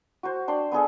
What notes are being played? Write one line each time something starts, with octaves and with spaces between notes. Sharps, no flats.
F#4 C5
D4 G5 C6
B3 D4 G#4 A4